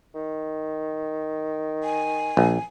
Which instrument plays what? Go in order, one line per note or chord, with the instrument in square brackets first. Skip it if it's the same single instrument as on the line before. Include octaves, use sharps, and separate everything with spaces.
[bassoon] D#3
[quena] G#5
[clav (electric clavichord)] A#1